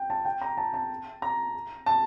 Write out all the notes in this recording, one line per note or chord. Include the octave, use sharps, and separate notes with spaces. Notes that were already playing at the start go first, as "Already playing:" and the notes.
Already playing: G5
A5
G5
A#5
A5
A5
A#5
A5